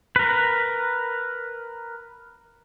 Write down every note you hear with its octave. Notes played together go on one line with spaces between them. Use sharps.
A#4 B4